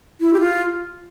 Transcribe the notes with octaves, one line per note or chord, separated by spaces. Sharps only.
E4
G4
F4